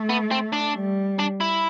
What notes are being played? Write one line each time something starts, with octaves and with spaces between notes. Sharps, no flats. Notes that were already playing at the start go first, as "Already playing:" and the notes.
Already playing: A3
B3
C4
D4
G3
D4
E4